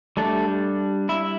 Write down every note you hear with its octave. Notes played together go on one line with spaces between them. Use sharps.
G3 A3 D4 A4
E4 E5